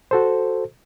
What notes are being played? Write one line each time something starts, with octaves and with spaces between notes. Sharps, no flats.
F#4 A4 C5